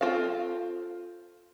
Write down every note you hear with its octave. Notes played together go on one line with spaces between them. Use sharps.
C4 F4 A4 F5